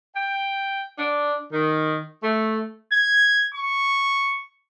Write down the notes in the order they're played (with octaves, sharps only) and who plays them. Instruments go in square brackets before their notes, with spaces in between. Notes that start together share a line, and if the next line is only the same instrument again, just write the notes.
[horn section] G5
D4
D#3
A3
[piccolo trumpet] G#6
C#6